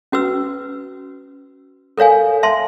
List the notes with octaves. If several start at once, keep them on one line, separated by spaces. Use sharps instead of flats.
C#4 F#4 B4 E6
A4 A#4 C#5 F5 G#5
E5 A5 C6